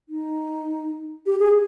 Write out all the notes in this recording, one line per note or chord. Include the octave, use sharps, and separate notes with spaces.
D#4
G4
G#4